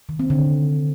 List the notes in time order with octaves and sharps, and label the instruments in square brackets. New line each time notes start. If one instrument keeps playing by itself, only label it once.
[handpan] D#3
C4
D3